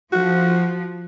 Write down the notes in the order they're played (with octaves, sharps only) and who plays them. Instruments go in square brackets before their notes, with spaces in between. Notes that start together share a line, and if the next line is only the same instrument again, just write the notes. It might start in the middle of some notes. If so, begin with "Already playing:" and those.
[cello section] F3 [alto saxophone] F#4